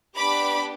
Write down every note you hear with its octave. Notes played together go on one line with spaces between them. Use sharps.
B3 D4 G4 B5 D6